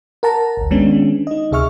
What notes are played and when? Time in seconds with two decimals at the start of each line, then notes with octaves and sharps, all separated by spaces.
0.23 A#4 F#5 A5 A#5
0.57 G#1 D2
0.71 D#3 G#3 B3 C#4 D4
1.27 D#4 D#5
1.51 C#2 C3 G#4 E5 C#6 F6